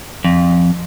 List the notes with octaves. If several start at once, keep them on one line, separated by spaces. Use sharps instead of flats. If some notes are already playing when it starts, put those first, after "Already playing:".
F2